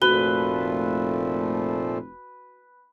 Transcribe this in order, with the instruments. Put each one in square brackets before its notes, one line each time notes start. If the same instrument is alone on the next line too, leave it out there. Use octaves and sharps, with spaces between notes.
[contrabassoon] F1 [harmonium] A#2 F3 A3 [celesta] F#4 G7 [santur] B4